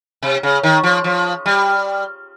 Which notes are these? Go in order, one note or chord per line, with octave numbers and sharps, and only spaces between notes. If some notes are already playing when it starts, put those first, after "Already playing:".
C3
C#3
D#3
F3
F3
G3